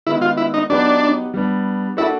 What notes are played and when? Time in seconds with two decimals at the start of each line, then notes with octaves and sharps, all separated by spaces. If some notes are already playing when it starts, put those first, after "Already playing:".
0.07 D#3 G#3 B3 E4
0.21 F4
0.37 E4
0.54 D#4
0.70 F#3 B3 D4 D#4 G4 B4
1.34 G3 B3 D4
1.97 A#3 D4 E4 F#4 A4